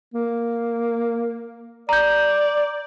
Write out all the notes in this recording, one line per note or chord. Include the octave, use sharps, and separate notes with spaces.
A#3
D5 A#5 G6